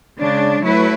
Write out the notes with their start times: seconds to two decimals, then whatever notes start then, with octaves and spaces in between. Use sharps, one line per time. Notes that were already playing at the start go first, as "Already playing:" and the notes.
0.19 C#3 G#3 D4
0.63 F#3 A3 E4 B4